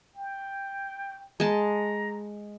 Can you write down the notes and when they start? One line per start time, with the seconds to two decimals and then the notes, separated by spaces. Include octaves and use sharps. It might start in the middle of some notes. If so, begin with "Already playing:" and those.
0.16 G5
1.40 G#3 A5 A#5